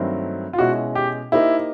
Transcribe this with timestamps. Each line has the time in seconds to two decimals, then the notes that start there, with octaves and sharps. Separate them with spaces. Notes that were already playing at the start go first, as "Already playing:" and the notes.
Already playing: G2 D#3 F#3 A3 C4
0.53 F4
0.58 B2 G#3 C#4 E4 F#4
0.95 G4
1.32 A#3 D#4 E4 G4 C5